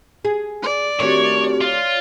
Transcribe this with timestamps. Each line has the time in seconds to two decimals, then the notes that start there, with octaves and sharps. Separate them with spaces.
0.25 G#4
0.63 D5
1.00 D#3 A3 C4 D4 F#4 G4 C#5
1.61 F4 C#5 D5